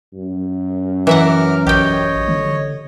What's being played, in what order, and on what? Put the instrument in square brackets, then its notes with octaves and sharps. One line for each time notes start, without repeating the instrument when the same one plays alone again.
[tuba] F#2
[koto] E3 E5 F#5 [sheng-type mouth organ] A#4 D6 F6
[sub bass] A1 [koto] G4 G5 [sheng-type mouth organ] C#5 D#5
[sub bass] D3